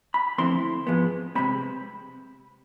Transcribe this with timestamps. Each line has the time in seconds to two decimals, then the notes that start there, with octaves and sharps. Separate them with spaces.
0.14 B5
0.38 F2 D3 A3 C4 E4 C6
0.87 G#2 F3 G#3 B3
1.35 C3 G#3 C4 B5